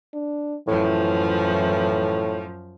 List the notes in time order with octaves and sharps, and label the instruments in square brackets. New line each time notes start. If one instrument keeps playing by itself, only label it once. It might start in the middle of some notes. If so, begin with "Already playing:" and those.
[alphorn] D4
[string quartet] F#2 F3 [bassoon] A2 [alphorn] E3